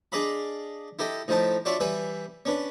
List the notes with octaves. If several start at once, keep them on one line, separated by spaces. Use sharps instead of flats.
D4 G#4 D5 D#5 F5 B5
E4 G4 A4 D#5
A2 F3 D#4 E4 A5
D4 F4 F#4 C#5 D5 E5
E3 G3 B4 E5 G#5
C#4 D4 B4